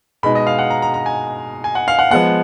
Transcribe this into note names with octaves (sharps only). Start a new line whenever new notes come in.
B2 G#3 D#4 B5
D#5
F5
F#5
A#5
A#5
A#5
G#5
G#5
F#5
F5
F#5
F3 G#3 B3 F#5